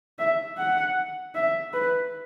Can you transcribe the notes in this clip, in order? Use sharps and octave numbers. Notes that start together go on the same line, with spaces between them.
E5
F#5
E5
B4